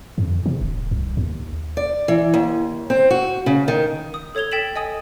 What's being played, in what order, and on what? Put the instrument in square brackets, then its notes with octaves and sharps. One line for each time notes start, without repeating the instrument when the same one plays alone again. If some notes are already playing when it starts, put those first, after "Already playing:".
[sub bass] F2
C3
D1
C2
D#2
[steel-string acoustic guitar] D5
E3
D#2
C4
F#4
C#3
D#3
[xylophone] D#6
A4 C#5 G#6 F7 G7
A4 G5 A6 B6 E7 F#7
D#5 G#5 D#6